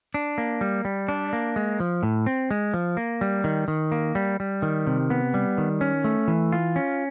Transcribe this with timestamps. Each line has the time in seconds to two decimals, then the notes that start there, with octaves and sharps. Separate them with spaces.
0.14 D4
0.38 A#3
0.61 G3
0.85 G3
1.08 D4
1.33 A#3
1.56 G#3
1.80 F3
2.03 A2
2.26 C4
2.51 G#3
2.74 F3
2.97 A#3
3.21 G3
3.44 D#3
3.68 D#3
3.92 A#3
4.15 G3
4.40 G3
4.62 D#3
4.87 C3
5.10 B3
5.34 G3
5.58 D#3
5.81 C#4
6.04 A3
6.28 E3
6.52 F4
6.76 C#4